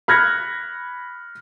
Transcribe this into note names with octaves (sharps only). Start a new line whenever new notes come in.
B5 F6 F#6 G#6 A#6 C#7